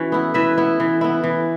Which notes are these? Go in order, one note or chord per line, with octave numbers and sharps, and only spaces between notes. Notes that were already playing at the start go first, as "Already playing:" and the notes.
Already playing: E3 C#4 F#4
B3 E4
E3 B4 E5
B3 E4
E3
B3 E4
E3